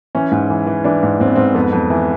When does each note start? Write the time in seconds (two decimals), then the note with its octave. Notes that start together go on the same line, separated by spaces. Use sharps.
0.15 E3 C#4
0.32 G#2
0.50 E3
0.67 E3
0.84 E3 D4
1.03 G#2
1.20 G#2 C4
1.27 B3
1.35 G#2 C4
1.55 F2 B3
1.73 F2
1.90 E3